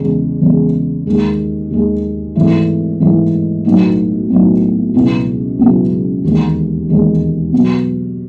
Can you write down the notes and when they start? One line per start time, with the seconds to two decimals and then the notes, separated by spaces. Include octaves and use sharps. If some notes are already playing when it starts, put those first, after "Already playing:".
Already playing: E2 C#3 G#3
0.41 E2 C#3 G#3
1.06 D#2 D#3 G#3
1.71 D#2 D#3 G#3
2.35 G#1 G#2 E3 A3 E4
3.00 G#1 G#2 E3 A3 E4
3.65 B1 A2 F#3 B3 D#4
4.29 B1 A2 F#3 B3 D#4
4.94 C#2 B2 F#3 B3 E4
5.59 C#2 B2 F#3 B3 E4
6.24 E1 D#2 D#3 G#3
6.88 E1 D#2 D#3 G#3
7.53 B2 F#3 B3